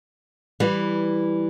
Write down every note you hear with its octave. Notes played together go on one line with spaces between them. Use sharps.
E3 G3